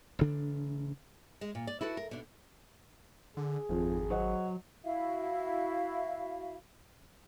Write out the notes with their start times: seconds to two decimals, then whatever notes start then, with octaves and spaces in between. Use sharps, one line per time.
0.19 A1 C#3 D4
1.41 G#3
1.55 A#2
1.67 D5
1.81 E4 F#4 A4 B4
1.97 A#4
2.11 B2 D4
3.37 D3 G#4
3.69 G#1 F2 F3
4.10 F#3 C5 D#5 F#5
4.83 E4 F#4 E5 F5